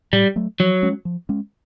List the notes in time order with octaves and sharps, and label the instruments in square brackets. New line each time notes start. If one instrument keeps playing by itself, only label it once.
[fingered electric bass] A2 [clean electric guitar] G3
[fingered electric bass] F#3 A3
[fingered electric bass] F3 [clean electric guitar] F#3
[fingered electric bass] G#3 C#4
F3
G#3 C#4